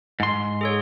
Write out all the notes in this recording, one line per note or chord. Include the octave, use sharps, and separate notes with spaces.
G#2 C6
G#4 A4 C#5